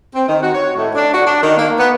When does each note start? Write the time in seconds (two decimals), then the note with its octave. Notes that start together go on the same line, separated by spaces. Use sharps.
0.15 C4
0.28 D#3
0.42 F#4
0.54 C#5
0.77 A2
0.95 D4
1.14 F#4
1.27 D4
1.42 D#3
1.57 A#3
1.79 B3